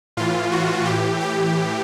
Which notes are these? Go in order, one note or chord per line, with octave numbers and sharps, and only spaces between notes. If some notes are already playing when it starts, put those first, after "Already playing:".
A2 E3 F4
F#4
A2 E3 G4
G4